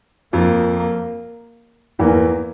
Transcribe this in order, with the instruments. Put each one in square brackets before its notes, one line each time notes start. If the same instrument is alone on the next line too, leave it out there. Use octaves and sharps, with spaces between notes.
[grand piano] F2 F3 [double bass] A#3
[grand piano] E2 E3 [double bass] A#3